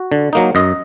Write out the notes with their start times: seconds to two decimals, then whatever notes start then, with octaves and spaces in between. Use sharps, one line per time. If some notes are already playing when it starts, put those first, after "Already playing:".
Already playing: F#4
0.12 D3
0.33 F#3 A#3 D#4
0.55 F#2 D#5